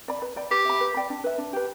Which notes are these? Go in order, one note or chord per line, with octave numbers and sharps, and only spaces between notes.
D5 B5
B4
D5 G5 B5
G4 B4
E5 B5
B4
D5 G5 B5
D4
B4 E5
D4
G4 B4